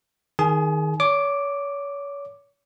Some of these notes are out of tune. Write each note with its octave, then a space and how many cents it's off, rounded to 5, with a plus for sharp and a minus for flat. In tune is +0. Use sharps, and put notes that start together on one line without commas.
D#3 +5 G#4 +0 G#5 +40
C#5 +30 D6 +0